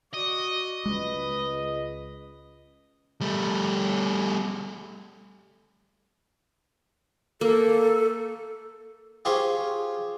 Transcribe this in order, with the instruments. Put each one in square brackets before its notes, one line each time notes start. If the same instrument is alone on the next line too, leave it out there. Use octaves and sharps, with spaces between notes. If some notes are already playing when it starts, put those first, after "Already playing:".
[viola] F#4 D5 [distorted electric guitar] D#5
[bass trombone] C#2 [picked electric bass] G#3 [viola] B4
[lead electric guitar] G3 A3
[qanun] A#3 [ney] A4
[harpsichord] F4 G4 G#4 C5 C#5